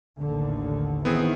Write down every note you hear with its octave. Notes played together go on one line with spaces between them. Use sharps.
A1 D#2 D3
D#3 E3 B3 C4 G#4